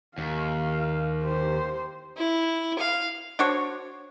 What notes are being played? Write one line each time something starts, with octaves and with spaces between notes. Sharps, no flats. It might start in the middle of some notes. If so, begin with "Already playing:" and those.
D#2 F5
G4 C5
E4
F5
D4 F#4 C5 C#5